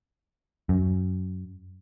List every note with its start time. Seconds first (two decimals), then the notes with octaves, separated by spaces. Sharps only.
0.69 F#2